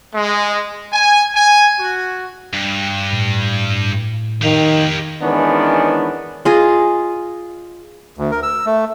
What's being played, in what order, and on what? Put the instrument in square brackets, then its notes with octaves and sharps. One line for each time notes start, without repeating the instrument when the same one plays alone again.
[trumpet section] G#3
G#5
G#5
F#4
[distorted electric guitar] G2
[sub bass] A2
[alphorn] D#3 [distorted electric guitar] G4 F5
[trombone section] D#3 E3 G#3 B3 C#4 D4
[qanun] F4 G#4 D#5
[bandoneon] D2
A#4
E6
A3